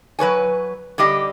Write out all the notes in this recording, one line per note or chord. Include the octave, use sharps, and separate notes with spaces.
F#3 B4 C#5 G#5
D3 G3 G4 D#5